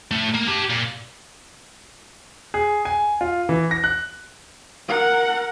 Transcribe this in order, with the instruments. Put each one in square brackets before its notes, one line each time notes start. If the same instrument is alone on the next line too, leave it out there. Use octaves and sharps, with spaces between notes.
[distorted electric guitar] A2 A3
A#3
G4 A5
A#2
[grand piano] G#4
G#5
F4
E3
A#6
F#6
[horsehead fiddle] A#4 F#5